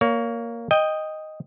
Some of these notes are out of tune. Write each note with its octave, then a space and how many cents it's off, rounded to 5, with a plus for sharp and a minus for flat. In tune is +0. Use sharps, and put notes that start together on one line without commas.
A#3 +0 C#5 +30
D#5 +0 G5 +15